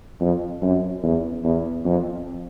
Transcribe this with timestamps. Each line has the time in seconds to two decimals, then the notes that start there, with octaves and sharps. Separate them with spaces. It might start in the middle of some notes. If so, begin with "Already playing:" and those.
0.21 F2
0.62 F#2
1.03 E2
1.44 E2
1.85 F2